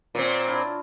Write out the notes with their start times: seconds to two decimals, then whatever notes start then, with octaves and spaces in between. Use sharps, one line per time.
0.15 A#2 C4 C#5 D5
0.47 D4 E4 F4